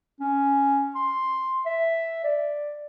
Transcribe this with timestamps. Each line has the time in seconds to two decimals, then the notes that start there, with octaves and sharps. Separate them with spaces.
0.20 C#4
0.95 C6
1.66 E5
2.24 D5